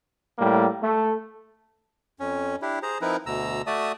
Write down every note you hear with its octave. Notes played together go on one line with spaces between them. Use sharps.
A2 G3 A#3
A3
F2 C#4
D4 E4 G4
G#4 C5 A#5
F3 C4 D#4 E4 A#4 B4
D2 B2 A#5 E6
A3 F#4 D5 E5 A5 D#6